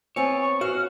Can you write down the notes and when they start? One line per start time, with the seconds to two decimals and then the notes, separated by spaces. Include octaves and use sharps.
0.16 B3 C4 C#5 G#5 A5
0.42 C#6
0.61 F#4 F5 F6